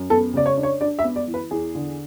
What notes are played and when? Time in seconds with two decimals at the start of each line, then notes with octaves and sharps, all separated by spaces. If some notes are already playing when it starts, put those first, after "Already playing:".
Already playing: F#2
0.10 B3 A4
0.34 C#3 D5
0.46 C#5
0.57 D4
0.63 C#5
0.81 D4 D5
0.99 E5
1.04 B3
1.16 D5
1.28 E3
1.34 B4
1.51 E2 G#4
1.75 D3